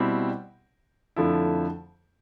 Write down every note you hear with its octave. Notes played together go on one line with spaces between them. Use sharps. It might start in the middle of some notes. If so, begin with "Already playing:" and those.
Already playing: B2 G3 C4 E4 G4
F2 D3 F3 A3 E4